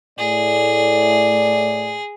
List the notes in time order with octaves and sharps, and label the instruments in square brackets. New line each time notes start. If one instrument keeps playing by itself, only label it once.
[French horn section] A2 A3 D5 [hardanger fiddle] G#4